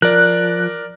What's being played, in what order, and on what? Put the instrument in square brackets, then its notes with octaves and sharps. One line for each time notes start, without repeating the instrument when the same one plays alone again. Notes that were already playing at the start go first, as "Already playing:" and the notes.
[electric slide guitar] F3 [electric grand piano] A#4 D5 [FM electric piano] F#6